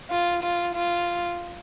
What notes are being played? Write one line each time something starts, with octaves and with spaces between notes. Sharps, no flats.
F4
F4
F4